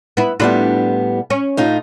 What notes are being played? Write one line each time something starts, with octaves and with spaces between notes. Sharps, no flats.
B3 E4
A2 G3 B3 D4 E4 F4
C#4
A2 D#4 F4